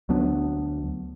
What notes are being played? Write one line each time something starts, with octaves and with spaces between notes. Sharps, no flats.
D2 F#3 B3 D4